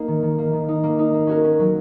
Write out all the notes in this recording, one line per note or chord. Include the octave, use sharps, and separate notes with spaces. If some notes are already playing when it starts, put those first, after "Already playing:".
Already playing: A#3 D#4
D#3
D#3
A#3
D#3
D#4
A#3
D#4
A#3
C#4 F#4 A#4
C#4
F#3